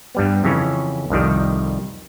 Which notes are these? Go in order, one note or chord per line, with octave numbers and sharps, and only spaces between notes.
G2 G3 B3
F2 C#3 E3 C#4
C2 F2 D#3 G3